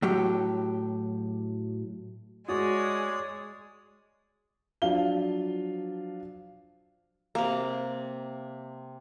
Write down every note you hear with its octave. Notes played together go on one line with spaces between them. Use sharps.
A2 F#3 G4
G#3 F#4 C#5 D5 D#6
F3 F#3 D4 F4 F5 G7
C3 A#3